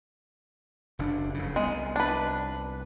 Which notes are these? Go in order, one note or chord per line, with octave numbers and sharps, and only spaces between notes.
F#1 C3 D4
F1 C#3
C2 G#3 B3
D4 B4